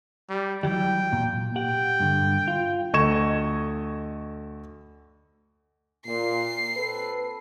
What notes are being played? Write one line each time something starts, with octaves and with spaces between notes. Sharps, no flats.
G3
E3 F#3 G3 G5
A#2
G4 F#5 G5
G2 D3
F4
D2 A4 D#5 C#6 G#6 E7
A#2 C7
C4 A4 B4